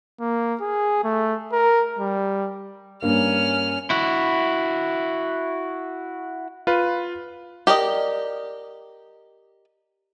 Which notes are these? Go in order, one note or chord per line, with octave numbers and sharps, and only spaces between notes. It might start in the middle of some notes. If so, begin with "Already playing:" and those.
A#3
G#4
A3
A#4
G3
G2 A#3 C#4 F6
E4 F#4
F4 B4
G4 A#4 D5 D#5